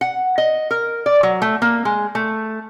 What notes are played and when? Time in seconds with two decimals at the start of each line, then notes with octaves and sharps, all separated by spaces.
0.01 F#5
0.38 D#5
0.71 A#4
1.06 D5
1.23 F#3
1.42 A3
1.62 A#3
1.85 G#3
2.15 A3